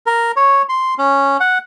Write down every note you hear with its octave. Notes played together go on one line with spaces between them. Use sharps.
A#4
C#5
C6
C#4
F#5